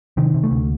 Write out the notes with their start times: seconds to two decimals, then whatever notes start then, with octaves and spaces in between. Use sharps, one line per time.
0.17 C3 D#3
0.34 C3
0.43 A3
0.51 D2